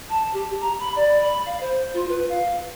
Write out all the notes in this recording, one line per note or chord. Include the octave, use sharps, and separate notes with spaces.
A5
G4
A#5
B5
D5
B5
F5
C5
F4
B4
F5